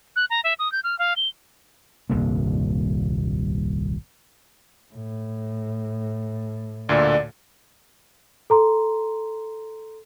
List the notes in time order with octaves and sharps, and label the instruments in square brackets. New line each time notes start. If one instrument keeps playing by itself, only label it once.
[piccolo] F#6
A#5
E5
D#6
G6
F6
F5
G7
[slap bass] D#1 C2 G2 A#3
[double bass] A2
[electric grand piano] D2 A#2 D3 [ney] D5
[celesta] A4 A#5 C6